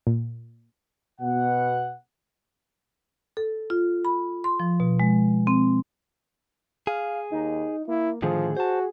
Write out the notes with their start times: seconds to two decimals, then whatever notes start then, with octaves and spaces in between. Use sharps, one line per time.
0.07 A#2
1.21 B2 F#5
3.37 A4
3.70 F4
4.05 B5
4.44 C6
4.60 F3
4.80 B2
5.00 G#3
5.47 C4
6.87 G#4 F5
7.31 D#2 D#4
7.88 A#3 E4
8.22 A2 D3 D#3 F3 G#4
8.57 F#4 C5 A5